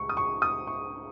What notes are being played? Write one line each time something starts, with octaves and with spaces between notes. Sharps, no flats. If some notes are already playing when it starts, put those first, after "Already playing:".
Already playing: C#2 C#6
D#6
C#6
D#6
C#6